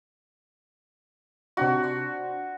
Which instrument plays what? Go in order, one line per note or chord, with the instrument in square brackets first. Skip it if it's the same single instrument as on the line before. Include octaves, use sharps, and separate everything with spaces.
[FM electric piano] C3 D4 D#4 [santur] F#4
[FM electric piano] D4 C5